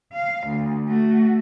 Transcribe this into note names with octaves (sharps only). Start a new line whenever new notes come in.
F5
D2
A3 F#4